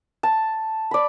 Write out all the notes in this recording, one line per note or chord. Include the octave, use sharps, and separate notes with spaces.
A5
D5 B5